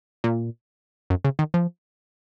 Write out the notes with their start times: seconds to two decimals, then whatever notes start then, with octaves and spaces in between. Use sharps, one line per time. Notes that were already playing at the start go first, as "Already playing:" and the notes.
0.24 A#2
1.10 F#2
1.25 C#3
1.39 D#3
1.54 F3